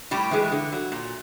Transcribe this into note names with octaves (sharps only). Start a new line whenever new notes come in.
A2 G3 G4
E3 G#3
D3
F#3
A#2